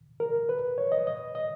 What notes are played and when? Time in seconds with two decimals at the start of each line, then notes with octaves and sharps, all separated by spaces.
0.20 A#4
0.49 B4
0.78 C#5
0.92 D#5
1.07 D#5
1.35 D#5